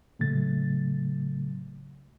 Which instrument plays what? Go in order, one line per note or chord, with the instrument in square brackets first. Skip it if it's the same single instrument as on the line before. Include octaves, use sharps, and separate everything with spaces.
[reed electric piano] A2 C#3 F#3 A3 A6